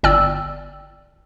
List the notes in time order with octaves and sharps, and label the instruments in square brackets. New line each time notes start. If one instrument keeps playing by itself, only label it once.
[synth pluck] G1 D5 G5 E6